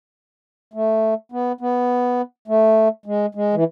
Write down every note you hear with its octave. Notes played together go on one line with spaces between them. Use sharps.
A3
B3
B3
A3
G#3
G#3
E3